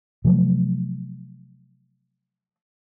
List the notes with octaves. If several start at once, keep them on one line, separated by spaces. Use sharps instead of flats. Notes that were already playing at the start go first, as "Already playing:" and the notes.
C3 F3 F#3 A3